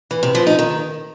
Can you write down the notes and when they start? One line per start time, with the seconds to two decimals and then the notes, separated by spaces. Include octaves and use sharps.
0.11 E3
0.23 C3
0.35 F3
0.47 D#4
0.59 D#3